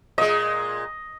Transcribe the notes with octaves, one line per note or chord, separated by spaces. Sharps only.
A#2 G#3 D#5